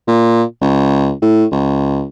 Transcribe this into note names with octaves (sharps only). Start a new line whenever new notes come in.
A#2
C#2
A2
C#2